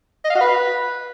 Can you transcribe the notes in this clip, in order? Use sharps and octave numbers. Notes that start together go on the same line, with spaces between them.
D#5
F5
F#4
B4